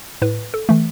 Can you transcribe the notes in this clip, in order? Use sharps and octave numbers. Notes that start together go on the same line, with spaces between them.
A2 B4
A4
E3 A3